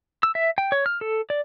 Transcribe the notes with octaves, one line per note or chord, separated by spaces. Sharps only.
E6
E5
G5
C#5
F6
A4
D5